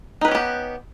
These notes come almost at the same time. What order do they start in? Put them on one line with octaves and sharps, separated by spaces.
D#4 B4 C#4 G4 B3